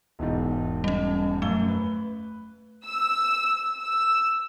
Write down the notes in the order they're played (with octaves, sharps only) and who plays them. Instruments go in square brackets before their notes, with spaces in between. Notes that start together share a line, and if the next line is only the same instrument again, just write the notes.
[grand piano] E1 E2 G#2
[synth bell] G3 C#4
[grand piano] F#2 G7 [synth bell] A3
[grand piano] B4
[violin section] E6
E6